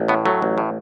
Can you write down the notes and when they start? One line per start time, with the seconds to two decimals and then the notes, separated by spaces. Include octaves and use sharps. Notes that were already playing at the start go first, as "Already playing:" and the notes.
Already playing: A1
0.08 A2 B3
0.25 F#3 A3
0.42 A1
0.58 A2